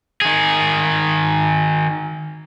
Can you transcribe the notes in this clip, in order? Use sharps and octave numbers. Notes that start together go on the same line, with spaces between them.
D#3 G#4